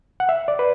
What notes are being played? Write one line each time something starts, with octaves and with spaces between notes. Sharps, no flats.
F#5
E5
D5
B4